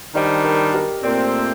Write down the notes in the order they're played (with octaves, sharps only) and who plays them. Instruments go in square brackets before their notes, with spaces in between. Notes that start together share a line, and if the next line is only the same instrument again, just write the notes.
[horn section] D#3 G3 D4 [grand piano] C5 D#5
[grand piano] A#4 D5
G4 A#4
[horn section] A#2 A3 C4 [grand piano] A#4 D5